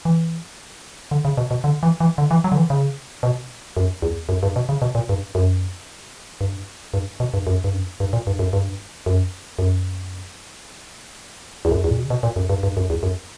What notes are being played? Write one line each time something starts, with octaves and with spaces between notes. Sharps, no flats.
E3
D3
C#3
B2
B2
D3
E3
E3
D3
E3
F#3
D3
E3
C#3
B2
F#2
E2
F#2
G2
B2
C#3
B2
A#2
G2
F#2
G2
G2
B2
G2
F#2
G2
F#2
G2
A#2
G2
F#2
G2
F#2
F#2
E2
F#2
E2
A#2
B2
C#3
B2
A#2
F#2
G2
G2
F#2
E2
F#2